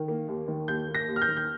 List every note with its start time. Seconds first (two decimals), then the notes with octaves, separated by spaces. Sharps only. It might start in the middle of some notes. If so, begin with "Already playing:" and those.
Already playing: D#3
0.08 A#3
0.28 D#2
0.48 D#3
0.68 D#2 G6
0.88 A#3
0.95 A#6
1.08 D#2
1.16 F6
1.22 G6
1.28 D#3
1.37 G6